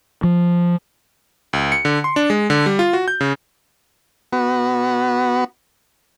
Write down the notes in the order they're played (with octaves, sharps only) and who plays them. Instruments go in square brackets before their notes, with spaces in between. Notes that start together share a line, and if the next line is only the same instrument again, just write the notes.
[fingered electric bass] F3
[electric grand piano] C#2
C#7
D3
C6
D4
G#3
D3
G3
F4
F#4
G6
C#3
[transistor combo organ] B3 F#4